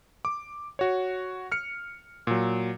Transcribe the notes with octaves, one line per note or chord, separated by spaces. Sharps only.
D6
F#4 C#5
F6 C#7
A#2 F#3